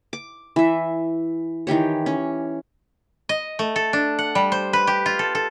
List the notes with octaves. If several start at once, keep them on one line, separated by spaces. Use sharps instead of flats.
D6
E3 E5
D#3 E3 G4 C#5
C#4
D#5
A3
A4
D4
F#5
G3
C5
B4
G4
F4
A4
A4